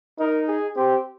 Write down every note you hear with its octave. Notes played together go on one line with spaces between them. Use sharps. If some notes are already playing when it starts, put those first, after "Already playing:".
D#4 A#4
G#4
C4 G4